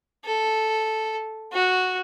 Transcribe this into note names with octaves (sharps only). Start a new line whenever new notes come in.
A4
F#4